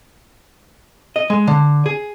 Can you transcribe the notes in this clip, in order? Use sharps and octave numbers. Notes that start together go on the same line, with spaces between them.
D#5
G#3
D3
G#4